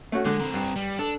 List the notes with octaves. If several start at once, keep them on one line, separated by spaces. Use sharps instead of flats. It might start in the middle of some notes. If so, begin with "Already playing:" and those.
A3 C#4 F#4
D3 G#3
C4 A#4
G2
G3
D4 A4